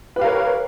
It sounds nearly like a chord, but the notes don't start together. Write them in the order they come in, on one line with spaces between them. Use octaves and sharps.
B4 G4 F5 A#4 C#5